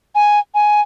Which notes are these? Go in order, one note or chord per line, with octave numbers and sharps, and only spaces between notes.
G#5
G#5